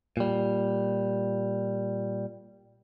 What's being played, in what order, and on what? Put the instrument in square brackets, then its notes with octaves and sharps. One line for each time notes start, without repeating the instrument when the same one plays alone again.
[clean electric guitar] A#2 G3